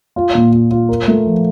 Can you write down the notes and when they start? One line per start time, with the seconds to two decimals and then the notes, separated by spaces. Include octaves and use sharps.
0.16 F4
0.35 A#2
0.52 F4
0.71 F4
0.89 A#4
1.08 A3
1.26 F3